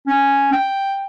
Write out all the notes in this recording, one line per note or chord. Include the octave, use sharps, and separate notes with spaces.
C#4
G5